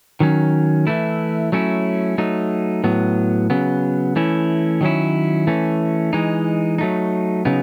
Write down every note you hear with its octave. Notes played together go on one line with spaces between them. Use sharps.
D#3 F#3 C#4
E3 A3 E4
F#3 A3 C#4 E4
F#3 A3 D#4
A2 F#3 B3
C#3 F#3 B3
E3 A3 C#4 E4
D#3 F#3 C#4 E4
E3 A3 C#4
E3 G#3 D#4
F#3 A3 D#4
C#3 F#3 B3 D#4